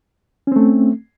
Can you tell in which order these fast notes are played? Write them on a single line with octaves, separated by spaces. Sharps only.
C#4 C4 A3